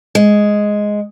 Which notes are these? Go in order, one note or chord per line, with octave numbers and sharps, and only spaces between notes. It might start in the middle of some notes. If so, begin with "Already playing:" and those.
G#3